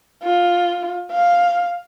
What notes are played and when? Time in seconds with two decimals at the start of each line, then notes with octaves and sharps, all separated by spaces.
0.23 F4
1.12 F5